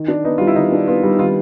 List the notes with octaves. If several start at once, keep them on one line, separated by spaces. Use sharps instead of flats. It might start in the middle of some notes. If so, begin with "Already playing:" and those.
Already playing: D#3
D4
B3 D#4
G3 F4
E4
D#3 D#4
D4
B3 F4
G3
D#3 F4